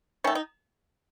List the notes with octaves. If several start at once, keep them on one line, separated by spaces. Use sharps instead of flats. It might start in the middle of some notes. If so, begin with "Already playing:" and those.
D#3 A3 C#4
D#4